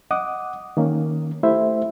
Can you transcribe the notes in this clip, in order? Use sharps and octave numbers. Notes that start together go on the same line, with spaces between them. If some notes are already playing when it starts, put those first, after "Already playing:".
D#5 F#5 D6 D#6
D#3 A#3 C#4
A3 E4 G4 C5 E5